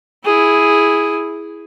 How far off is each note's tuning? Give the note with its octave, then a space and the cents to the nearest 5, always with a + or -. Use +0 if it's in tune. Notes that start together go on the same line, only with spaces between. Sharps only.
E4 +0 G#4 +0